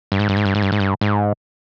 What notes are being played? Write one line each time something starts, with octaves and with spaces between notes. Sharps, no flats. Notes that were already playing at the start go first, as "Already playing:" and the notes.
G2
G#2
G2
G#2
G2
G#2
G2
G#2
G2
G#2